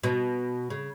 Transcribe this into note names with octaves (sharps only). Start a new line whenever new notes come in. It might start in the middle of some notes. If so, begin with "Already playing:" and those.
B2
C#3